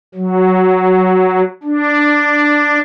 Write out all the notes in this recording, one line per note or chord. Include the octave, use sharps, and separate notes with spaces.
F#3
D4